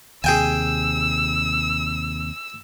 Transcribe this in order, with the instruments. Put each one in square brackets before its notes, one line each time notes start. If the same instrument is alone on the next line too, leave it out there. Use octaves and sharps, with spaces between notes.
[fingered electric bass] D#2 C3 [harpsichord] G#4 G5 G#5 [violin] E6